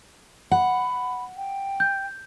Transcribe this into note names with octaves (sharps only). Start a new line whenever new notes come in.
F#5 B5
G5
G6